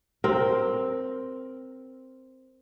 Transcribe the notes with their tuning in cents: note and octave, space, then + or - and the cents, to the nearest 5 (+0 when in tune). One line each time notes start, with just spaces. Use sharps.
C4 +0 A#4 +0